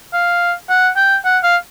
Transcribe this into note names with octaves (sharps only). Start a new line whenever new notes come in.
F5
F#5
G5
F#5
F5